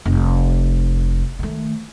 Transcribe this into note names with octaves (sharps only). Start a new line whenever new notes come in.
F1
D#3 A3